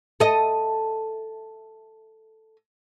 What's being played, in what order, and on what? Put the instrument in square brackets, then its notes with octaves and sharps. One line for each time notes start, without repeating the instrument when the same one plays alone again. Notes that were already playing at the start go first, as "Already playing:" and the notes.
[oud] A4 D#5